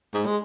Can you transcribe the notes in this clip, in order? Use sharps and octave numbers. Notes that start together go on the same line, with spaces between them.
G#2
G#3